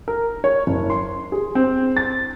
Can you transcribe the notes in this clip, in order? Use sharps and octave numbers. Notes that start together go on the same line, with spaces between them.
A#4
C#5
F#1
C6
G#4
C4
A6